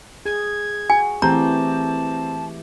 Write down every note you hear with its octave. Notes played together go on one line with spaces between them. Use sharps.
G#4 G#6
F#4 G#5
E3 A3 C4 G4 A5 A#5 G6